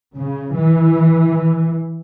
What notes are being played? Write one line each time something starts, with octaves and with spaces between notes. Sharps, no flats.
C#3
E3